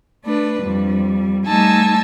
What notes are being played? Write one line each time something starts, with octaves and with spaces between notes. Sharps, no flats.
A3 D4 B4
F2 G3
G3 A3 D#4 G#5 A5 E6